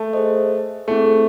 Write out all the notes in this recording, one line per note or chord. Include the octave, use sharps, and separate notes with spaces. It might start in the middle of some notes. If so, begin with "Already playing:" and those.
Already playing: A3
G#4 C5 D#5
A3 C4 E4 G#4